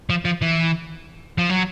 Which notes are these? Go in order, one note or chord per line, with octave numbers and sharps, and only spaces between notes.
F3
F3
E3
F3
F#3